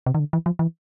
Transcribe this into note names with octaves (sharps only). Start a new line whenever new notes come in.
C3
D#3
D3
E3
F3
E3